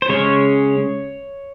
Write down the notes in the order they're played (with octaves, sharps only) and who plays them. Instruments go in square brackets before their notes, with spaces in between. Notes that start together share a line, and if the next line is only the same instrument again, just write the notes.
[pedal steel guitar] C5
C#3 G#3 C#4 C#5